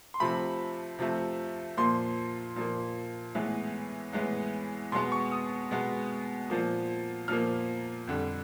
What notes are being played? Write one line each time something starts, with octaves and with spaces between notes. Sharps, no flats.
C6
C3 F3 A3 B5
C3 F3 A3
A#2 F3 A#3 C6
A#2 F3 A#3
A2 E3 G#3 B3
A2 E3 G#3 B3
B2 G#3 B3 C6
C#6
D#6
B2 G#3 B3
A#2 F3 A#3
A#2 F3 A#3 F6
F2 D3 G3